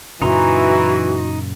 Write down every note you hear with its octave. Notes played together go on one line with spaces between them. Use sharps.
F#2 A#2 C#3 E3 D#4 F#4 A#5 C6